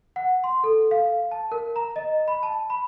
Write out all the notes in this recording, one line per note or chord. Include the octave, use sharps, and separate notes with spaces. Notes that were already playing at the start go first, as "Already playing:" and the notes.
F#5
C6
A4
F5
A5
A#4
A#5
D#5
B5
A5
B5